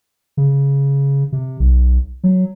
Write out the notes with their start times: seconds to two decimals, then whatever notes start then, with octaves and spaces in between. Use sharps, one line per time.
0.37 C#3
1.32 C3
1.60 B1
2.24 F#3